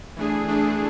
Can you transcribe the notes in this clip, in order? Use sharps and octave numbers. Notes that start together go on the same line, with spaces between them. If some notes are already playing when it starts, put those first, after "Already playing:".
E3 A3 D4 G#4
E3 A3 D4 G#4